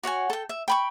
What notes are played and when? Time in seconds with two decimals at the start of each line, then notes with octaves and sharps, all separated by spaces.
0.03 F#4 C#5 F#5 G#5
0.30 A4 G5
0.49 E5
0.68 G5 B5 C#6